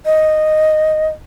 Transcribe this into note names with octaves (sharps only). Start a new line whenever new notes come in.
D#5